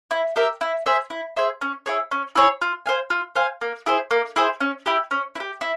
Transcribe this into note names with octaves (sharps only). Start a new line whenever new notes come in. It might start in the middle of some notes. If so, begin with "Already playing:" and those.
E4
G4 A#4 E5
E4
G#4 C5 E5
E4
G#4 C5 E5
C#4
E4 G#4 C#5
C#4
E4 G#4 C#5
F4
C5 F5 G#5
F4
C5 F5 G#5
A#3
E4 G#4 C5
A#3
E4 G#4 C5
C#4
E4 G4
C#4
E4
G4
E4